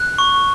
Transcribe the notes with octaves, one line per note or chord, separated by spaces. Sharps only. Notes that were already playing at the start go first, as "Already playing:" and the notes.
Already playing: F#6
C#6